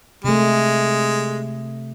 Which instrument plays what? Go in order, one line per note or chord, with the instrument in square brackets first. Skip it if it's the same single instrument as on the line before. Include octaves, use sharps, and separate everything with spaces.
[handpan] C3 A3 [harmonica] G#3